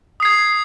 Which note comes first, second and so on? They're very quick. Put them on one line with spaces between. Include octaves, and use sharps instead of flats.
D#6 C7 G#6